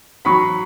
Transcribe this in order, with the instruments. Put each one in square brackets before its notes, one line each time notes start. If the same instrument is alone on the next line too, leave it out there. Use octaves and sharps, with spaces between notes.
[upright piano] F#3 B5 C#6